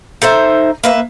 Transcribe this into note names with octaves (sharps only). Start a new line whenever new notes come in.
D#4 A4 C5 E5
A#3 B4 E5